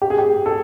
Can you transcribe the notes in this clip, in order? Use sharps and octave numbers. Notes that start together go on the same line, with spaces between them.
G4
G#4
G4
A4